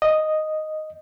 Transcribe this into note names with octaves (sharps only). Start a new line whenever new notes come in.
D#5